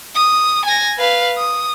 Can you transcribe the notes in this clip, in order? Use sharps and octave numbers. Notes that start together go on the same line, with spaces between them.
D#6
G#5 A#6
B4 F5
D#6